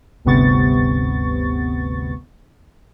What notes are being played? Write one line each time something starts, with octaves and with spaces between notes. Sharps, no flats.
G1 D2 C3 B3 C#6 A6